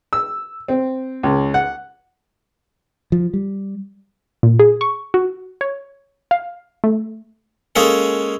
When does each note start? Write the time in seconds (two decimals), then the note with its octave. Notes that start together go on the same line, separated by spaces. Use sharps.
0.13 E6
0.68 C4
1.23 C#2
1.54 F#5
3.12 F3
3.34 G3
4.43 A#2
4.60 G#4
4.81 C#6
5.14 F#4
5.61 C#5
6.31 F5
6.84 A3
7.76 G#3 A#3 C#4 G#4 A4